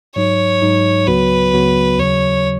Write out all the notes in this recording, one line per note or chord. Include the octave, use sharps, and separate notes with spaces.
G#2 F#3 D#4 C#5
G#2 F#3 D#4
C#2 C#3 F#3 B3 F#4 B4
C#2 C#3 F#3 B3 F#4
D#2 C#3 F#3 C#5